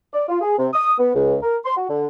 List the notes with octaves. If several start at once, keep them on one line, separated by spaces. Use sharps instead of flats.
D5
F4
G#4
C3
D#6
B3
C#2
A#4
C6
F#4
D3